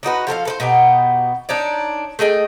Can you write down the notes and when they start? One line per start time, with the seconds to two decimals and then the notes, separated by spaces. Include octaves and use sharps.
0.03 D4 D#4 F#4 B4
0.27 F3 A4 A#4 F5
0.45 A4 B4 C5
0.60 B2 B3 D#4 G4
1.49 D4 D#4 C#5 D5
2.19 A3 G#4 D#5 G5